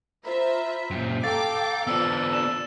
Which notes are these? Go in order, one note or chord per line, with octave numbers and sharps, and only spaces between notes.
F4 C5 E5 A#5 B5
F#2 A#2 G4 C5
A4 F5 G5 A#5 D6 A6
F2 E3 B3 D4 F4 E6
E7